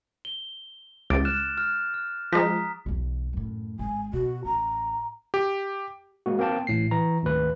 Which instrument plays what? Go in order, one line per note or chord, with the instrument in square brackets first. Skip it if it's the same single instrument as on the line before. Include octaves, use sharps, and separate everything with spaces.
[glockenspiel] G7
[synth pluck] C#2 [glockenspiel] D6 A6 D7
[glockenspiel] F6 F#6 E7
F6
F6
[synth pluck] F3 G#3 [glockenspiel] A#5 D#6 B6
[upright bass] B1 E2
F#2 A2
[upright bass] G#1 G#2 [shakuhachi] G#5
[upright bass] B2 [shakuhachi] F#4
[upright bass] A1 [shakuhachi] A#5
[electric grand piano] G4
[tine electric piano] G#3 A#3 F#4
A#3 C4 G5 A5
A1 A2 C7
E3 A#5
G#1 D2 B4